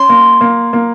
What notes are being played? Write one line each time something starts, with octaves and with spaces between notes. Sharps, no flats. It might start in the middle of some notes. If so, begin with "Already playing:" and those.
Already playing: C#4 C6
A#3
A#3
A#3